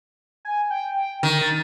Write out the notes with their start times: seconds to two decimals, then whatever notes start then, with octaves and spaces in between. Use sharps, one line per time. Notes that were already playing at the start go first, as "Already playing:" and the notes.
0.45 G#5
0.70 G5
1.23 D3 D#3
1.41 A6